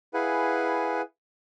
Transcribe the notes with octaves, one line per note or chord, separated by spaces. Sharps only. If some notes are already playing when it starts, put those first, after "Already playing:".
E4 G#4 B4 F5 F#5 G#5